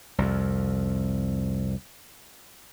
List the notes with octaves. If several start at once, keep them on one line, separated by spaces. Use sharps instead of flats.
C2 F2